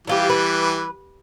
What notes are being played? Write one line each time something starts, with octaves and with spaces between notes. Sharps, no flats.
E3 G3 D4 F4 G4
B4